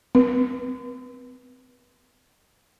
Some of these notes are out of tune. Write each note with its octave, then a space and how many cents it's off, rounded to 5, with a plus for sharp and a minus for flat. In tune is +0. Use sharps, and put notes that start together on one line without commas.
C4 -35 B4 -30